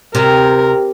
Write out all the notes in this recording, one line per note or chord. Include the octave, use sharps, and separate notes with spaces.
C3 A#4